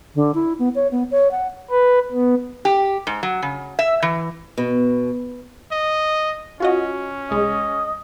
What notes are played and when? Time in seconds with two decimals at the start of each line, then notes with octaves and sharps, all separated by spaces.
0.15 D3
0.34 E4
0.59 B3
0.75 C#5
0.91 B3
1.11 C#5
1.31 F#5
1.71 B4
2.12 B3
2.65 G4
3.07 G#2
3.23 F#3
3.42 C#3
3.79 E5
4.02 E3
4.57 B2
5.72 D#5
6.60 C#4 F4 F#4 D#5
7.31 C2 G#3 D#5